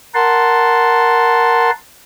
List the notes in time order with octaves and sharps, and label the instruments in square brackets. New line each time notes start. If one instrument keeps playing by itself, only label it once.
[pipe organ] A#4 F#5 A5 C6